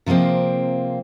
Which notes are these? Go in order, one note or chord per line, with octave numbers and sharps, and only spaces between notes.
C3 F3 G#3 A#3 C4